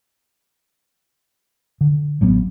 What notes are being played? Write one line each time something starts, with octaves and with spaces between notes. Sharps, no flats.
D3
A1 F#3 G#3 B3